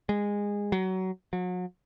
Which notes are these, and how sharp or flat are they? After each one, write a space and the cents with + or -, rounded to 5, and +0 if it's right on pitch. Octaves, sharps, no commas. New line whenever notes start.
G#3 -20
F#3 +20
F#3 -35